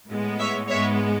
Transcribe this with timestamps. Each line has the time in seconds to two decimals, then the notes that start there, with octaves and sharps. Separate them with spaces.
0.09 A2 G#3 B3
0.40 C#5 E5
0.69 G#2 G#3 B3 C#5 E5